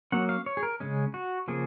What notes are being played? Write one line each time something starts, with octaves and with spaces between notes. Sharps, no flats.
F#3 A#3 C#4 F#5
F5
C#5
G#4
A#4
C#3 G#3 C#4
F#4
C#3 F3 A#3 G#4